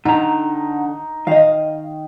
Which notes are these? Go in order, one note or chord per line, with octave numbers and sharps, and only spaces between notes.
D3 D#4 A#5
D#3 D#5 F5